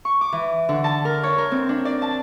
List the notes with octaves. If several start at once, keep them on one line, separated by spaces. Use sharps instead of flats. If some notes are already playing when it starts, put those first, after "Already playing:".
C#6
D6
E3
D3
A5
A#4
C#5
A#4
C4
D4
D5
A5